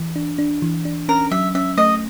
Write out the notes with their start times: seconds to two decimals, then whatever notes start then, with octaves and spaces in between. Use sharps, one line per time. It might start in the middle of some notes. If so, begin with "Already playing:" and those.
Already playing: E3
0.16 D4
0.38 D4
0.62 E3
0.85 D4
1.08 C#4 A#4
1.31 F#3 E5
1.55 C#4 E5
1.77 A3 D#5